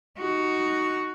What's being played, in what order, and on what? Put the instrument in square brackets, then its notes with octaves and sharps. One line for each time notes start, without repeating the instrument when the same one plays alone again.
[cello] D#4 F#4